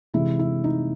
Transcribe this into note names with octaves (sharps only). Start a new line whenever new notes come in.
C3 E3 G#3 E4
E4
D#4